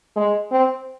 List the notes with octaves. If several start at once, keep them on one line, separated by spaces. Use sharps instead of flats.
G#3
C4